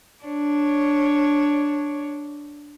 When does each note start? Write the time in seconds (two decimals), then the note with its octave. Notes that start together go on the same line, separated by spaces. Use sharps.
0.24 D4 C#5